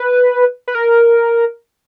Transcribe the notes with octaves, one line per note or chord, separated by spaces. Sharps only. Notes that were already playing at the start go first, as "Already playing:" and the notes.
Already playing: B4
B4
A#4